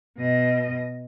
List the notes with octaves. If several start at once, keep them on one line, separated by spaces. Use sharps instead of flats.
B2 D#5